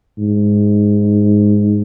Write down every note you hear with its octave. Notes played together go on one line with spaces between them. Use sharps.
G#2